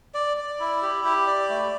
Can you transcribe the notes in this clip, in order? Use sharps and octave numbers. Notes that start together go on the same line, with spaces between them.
D5
D5
E4
G4
G4
D5
A3